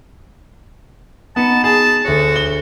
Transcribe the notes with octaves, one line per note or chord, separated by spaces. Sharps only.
B3 D#4 A5 C#7 E7
G#4 A5
D2 F#4 C#5
G7